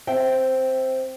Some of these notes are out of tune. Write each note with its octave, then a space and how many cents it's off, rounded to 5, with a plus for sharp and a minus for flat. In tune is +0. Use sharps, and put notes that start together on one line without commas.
C4 +0 E5 +0 G5 -15